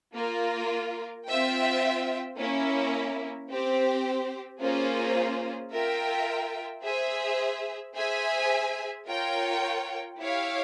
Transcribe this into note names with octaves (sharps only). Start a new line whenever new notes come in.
A#3 F4 A#4
C4 F4 C5 E5 G5
A#3 C#4 E4
C4 G4 C5
A#3 C#4 F4 G#4 C5
F4 A#4 E5 G5
G#4 C5 E5
G#4 C5 E5 G#5
F4 A#4 C#5 G5
E4 G4 C#5 F5